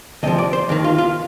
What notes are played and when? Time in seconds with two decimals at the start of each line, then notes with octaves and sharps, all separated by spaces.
0.23 D2 C3 F3 D#5
0.38 D5
0.53 C5
0.69 D#2 D#3
0.84 F4
0.98 F4